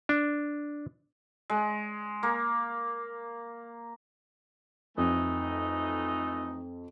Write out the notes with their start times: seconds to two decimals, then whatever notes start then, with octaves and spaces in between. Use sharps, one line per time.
0.09 D4
1.50 G#3
2.23 A#3
4.98 F2 E3 A3 D#4